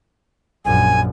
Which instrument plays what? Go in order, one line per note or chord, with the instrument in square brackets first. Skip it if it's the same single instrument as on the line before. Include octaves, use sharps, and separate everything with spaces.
[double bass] A#1 F#2 [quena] G#5